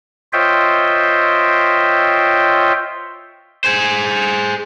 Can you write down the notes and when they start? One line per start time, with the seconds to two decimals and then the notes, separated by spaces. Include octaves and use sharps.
0.33 F4 C5 C#5 D#5 E5 G5
3.64 G#4 C5